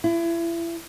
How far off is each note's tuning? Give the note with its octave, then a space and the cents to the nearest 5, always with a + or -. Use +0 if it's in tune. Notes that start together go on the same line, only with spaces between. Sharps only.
E4 +30